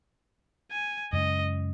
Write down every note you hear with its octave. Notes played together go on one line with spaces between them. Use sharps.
G#5
F#2 C#3 G#3 C#4 D#5